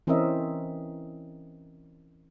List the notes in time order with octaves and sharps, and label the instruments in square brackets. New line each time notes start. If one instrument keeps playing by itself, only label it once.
[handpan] E3 C4 C#4 A#4 D#5 E5